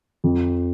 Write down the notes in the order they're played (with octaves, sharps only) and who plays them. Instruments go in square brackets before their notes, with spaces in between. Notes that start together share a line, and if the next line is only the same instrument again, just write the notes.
[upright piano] F2